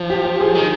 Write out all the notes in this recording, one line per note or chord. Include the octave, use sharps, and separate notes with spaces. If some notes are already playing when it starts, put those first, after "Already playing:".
Already playing: F3
G4
G4
G#4
D#3 G#4